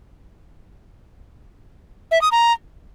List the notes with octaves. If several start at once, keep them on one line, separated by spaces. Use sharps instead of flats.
E5
D#6
A#5